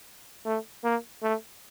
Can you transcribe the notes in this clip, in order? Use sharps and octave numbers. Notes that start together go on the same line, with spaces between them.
A3
A#3
A3